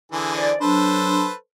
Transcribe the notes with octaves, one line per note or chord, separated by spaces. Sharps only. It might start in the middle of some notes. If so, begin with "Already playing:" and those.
D3 E3 G#4
C5 D5
F#3 D4 A4 B4 C5